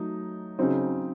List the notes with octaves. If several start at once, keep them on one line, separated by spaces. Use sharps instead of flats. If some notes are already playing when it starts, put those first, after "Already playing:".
Already playing: F#3 A3 D#4
C#3 F#3 C4 D#4